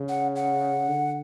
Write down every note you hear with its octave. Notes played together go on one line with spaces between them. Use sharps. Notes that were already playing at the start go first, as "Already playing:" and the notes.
Already playing: C#3
F#5
F#5
D3